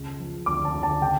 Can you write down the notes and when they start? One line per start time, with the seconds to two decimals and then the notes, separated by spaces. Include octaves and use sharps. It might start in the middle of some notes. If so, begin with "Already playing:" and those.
Already playing: C#2 C#3
0.19 F3
0.46 D2 D6
0.65 A5
0.74 D2
0.83 A5
1.01 C#3 G5